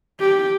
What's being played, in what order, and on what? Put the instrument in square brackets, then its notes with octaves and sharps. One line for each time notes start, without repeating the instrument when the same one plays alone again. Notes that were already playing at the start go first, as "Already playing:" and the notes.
[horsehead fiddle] G4